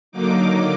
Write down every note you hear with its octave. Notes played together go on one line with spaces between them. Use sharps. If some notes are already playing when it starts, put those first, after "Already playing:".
D3 F#3 A#3 D#4 D6